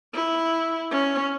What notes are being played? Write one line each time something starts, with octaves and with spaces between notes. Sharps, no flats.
E4
C#4